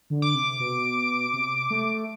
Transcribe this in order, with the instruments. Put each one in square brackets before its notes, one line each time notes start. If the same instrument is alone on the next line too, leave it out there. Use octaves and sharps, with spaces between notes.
[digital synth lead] D3
[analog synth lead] D6
[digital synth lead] C3
B2
C3
A3